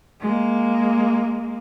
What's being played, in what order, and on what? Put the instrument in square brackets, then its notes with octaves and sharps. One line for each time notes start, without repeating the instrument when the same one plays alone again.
[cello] G#3 A#3